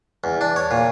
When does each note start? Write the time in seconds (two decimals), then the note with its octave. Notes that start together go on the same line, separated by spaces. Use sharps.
0.24 E2
0.41 D4
0.56 C#5
0.71 A#2